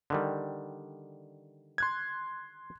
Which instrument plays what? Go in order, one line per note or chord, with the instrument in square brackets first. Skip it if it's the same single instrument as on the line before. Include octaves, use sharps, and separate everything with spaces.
[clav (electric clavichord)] D3 D#3 G3
[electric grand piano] C6 F#6 G#6